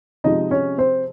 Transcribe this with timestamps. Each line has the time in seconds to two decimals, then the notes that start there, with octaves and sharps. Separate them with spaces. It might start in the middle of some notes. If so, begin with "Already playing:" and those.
0.24 C3 F3 G#3 D#4 D#5
0.51 C#4 C#5
0.78 C4 C5